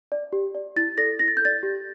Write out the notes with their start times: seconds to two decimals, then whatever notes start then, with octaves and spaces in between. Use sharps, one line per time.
0.12 D5
0.33 G4
0.55 D5
0.76 E4 A6
0.98 A4 D5 A#6
1.19 E4 A#6
1.28 A6
1.37 G6
1.42 A4 D5 A6
1.63 G4